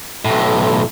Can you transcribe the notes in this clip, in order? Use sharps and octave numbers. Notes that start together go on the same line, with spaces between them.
B1 A2